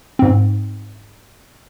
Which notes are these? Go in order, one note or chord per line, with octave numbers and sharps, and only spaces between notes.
G#2 C4